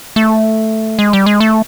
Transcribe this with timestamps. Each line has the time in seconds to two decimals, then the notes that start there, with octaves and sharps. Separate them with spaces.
0.16 A3
0.99 G#3
1.13 G3
1.26 G#3
1.40 A3